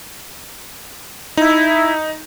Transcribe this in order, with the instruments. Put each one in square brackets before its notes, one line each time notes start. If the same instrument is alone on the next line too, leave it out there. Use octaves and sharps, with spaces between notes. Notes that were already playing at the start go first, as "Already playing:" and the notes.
[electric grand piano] D#4 [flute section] E4